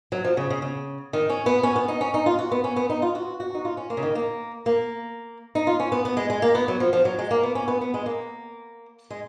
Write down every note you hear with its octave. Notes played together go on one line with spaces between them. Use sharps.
F#3
F3
C#3
C#3
C#3
D#3
C#4
B3
C#4
B3
D#4
C#4
D#4
F4
F#4
B3
C#4
B3
D#4
F4
F#4
F#4
D#4
F4
C#4
A#3
C#3
D#3
A#3
A#3
D#4
F4
C#4
B3
B3
G#3
G#3
A#3
B3
F#3
F3
F3
F#3
G#3
A#3
B3
C#4
B3
B3
G#3
A#3
G#3